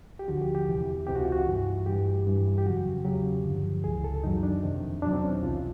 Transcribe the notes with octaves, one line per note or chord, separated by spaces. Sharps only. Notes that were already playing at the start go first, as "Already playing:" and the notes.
G4
D2 D3 F3 F#4
G4
G4
E2 C3 E3
C#2 C3 E3 G4
F#4
F4
F#4
G2 E3
G2 E3 G4
G2 E3
G4
F2 C#3 F#3 F#4
E2 C#3 F#3 G4
G2 D3 F3
C#2 C#3 E3 G#4
A4
F#2 D#3 F#3 D#4
D4
F2 C3 D#3
E2 B2 F#3 D4
C4
C#4
D#4
C2 C3 E3 F4